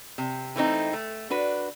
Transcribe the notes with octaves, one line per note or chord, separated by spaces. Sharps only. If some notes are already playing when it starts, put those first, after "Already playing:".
C3
E3 A3 C4 D#4
A3
D4 F#4 B4